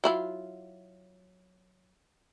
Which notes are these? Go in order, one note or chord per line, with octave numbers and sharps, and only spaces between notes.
F#3 E4 F4